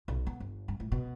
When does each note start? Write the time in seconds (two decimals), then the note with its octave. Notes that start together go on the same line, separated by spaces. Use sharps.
0.08 B1
0.26 B3
0.40 G1
0.68 G2
0.80 A2
0.92 B2